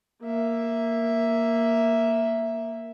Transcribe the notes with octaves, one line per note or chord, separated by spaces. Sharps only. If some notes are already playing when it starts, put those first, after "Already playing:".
A#3 E5